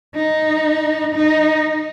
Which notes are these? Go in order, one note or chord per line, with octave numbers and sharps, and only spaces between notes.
D#4
D#4